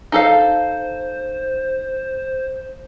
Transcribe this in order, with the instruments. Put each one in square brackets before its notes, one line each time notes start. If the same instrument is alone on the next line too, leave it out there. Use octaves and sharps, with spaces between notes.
[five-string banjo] D#4 A4 F5 [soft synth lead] C5